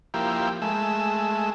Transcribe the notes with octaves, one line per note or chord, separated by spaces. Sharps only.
F3 A#3 E4 G4
G#3 A3 E5